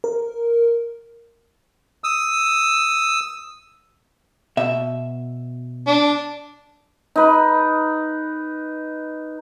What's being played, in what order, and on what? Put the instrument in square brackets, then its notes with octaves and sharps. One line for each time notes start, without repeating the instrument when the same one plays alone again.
[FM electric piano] A#4
[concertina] D#6 E6
[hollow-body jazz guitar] B2 E5
[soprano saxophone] D4
[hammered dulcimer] D#4 B4